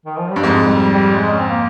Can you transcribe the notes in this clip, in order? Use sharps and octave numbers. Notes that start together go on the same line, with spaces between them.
D#3
F3
G2 G3
F2 G#2 G#3
G3
G3
G#3
C#4
C4
A#3